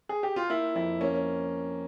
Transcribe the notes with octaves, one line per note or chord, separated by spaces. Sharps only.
G#4
G4
F4
A#3 E4
F2 E4
A#3 C#4